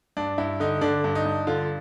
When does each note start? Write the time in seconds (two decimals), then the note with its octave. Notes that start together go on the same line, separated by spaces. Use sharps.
0.17 G2 D4
0.38 G2 E4
0.60 D3 D#4
0.81 D3 D4
1.04 G2
1.15 D#4
1.25 G2
1.47 D3 F4